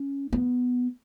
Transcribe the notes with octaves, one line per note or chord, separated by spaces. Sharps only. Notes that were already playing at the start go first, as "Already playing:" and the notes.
Already playing: C#4
B3